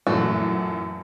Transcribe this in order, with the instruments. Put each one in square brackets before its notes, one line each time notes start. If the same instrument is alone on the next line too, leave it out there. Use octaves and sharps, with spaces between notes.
[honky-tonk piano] F#2 A#2 E3 [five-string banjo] A3 F#4